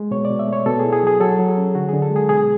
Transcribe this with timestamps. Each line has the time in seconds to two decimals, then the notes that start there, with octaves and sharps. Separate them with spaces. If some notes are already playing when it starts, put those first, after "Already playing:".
Already playing: G#3
0.11 B2 C#5
0.25 D5
0.30 B2
0.39 E5
0.48 A3 C#5
0.66 B2 A4
0.79 G#4
0.84 E4
0.93 G#4
1.03 F#3 G#4
1.20 F#3 A4
1.39 F#3
1.48 G#4
1.57 C#4
1.75 D3 F#4
1.89 D3 G#4
2.02 A4
2.11 G#3
2.16 G#4
2.29 B2 G#4